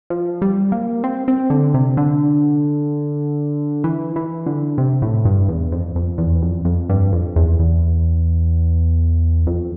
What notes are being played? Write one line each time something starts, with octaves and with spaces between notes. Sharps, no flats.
F3
G3
A#3
C4
C4
D3
C3
D3
E3
E3
D3
C3
A2
G2
E2
F2
F2
E2
F2
F2
G2
F2
E2
E2
F2